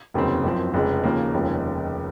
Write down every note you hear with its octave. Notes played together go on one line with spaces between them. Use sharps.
F1 D#2 C#3 F#3 C4
F#1 F#2 F3 C4
F1 F2 C#3 G#3
D#2 C#3 F3 A#3
F1 D#2 C#3 F3 G#3